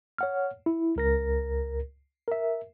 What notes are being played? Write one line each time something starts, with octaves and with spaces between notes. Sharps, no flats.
C#5 F#5 F6
E4
C#2 A#4 A#6
A#4 E5